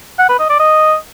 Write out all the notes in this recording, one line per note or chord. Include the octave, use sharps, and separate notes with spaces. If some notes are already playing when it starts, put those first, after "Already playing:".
F#5
B4
D#5
D5
D#5